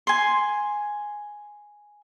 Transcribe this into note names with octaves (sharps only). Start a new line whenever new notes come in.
G#5 C6